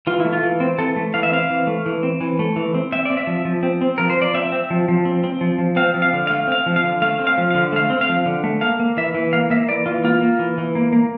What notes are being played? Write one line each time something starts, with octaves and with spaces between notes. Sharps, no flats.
E3 F4
A3 E4
F4
E3
C4
E3 A4
A3
E3 F5
E5
C4 F5
E3
A3
E3
C4
E3
A3
E3
C4
C4 E5
C4 D5
E5
F3
F3
C4
C4
F3 A#4
C5
F3 D5
C4 E5
C4
F3
F3
C4
C4
F3
F3
C4 F5
F3
F5
D3
A3 F5
C4 F5
F3
F5
D3
A3 F5
C4
F5
F3
D3 F5
A3 F5
C4
F5
F3
D3
A3
A#3 F5
A#3
E3 E5
E3
A#3 F5
A#3 E5
E3 D5
E3 F4
A#3 F4
A#3
E3
E3
A#3
A#3